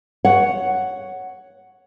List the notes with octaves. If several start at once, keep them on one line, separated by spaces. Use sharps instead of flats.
C#5 F#5